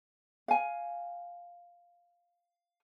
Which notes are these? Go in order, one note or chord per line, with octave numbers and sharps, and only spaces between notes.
F5 G#5